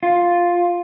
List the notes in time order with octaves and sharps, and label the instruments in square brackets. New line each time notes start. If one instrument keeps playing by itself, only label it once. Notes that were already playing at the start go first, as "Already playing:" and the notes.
[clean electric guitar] F4